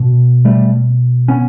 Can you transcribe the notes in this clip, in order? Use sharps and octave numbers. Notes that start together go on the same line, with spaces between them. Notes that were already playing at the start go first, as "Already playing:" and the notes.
Already playing: B2
G3 A3
B3 C#4